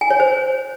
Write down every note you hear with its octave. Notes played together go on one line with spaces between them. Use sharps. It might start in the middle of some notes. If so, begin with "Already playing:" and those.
G#5
C#5
C5